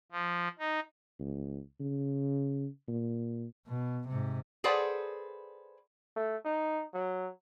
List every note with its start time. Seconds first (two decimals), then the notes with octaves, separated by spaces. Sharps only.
0.12 F3
0.59 D#4
1.19 C#2
1.80 C#3
2.88 A#2
3.67 B2
4.08 G#2 C3
4.64 G#4 A4 B4 C5 D5 F#5
6.16 A3
6.45 D#4
6.94 F#3